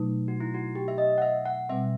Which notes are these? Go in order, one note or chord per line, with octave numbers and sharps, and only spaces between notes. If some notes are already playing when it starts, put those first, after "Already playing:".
Already playing: B2 F#3 A3 D#4
F#4
E4
F#4
G4
E5
D#5
F#5
E5
F#5
B2 G3 C4 E5